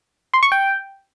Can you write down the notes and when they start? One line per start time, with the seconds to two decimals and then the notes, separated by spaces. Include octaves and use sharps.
0.34 C6
0.43 C#6
0.52 G5